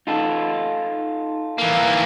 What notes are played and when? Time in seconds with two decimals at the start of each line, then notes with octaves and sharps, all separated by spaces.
0.07 D#4 F4 A4
1.58 E3 A#3